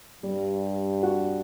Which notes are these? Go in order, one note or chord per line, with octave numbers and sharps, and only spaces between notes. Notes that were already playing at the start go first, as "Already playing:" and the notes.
G2 G3
F#4